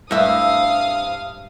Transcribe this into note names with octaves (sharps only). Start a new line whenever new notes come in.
G2 E5 F5 D#6